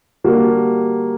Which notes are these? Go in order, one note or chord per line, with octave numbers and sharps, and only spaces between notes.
D3 G3 A#3 F#4